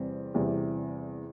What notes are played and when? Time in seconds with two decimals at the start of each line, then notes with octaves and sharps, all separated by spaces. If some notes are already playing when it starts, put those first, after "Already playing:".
Already playing: E2 C3 G3 C4
0.34 E2 C3 G3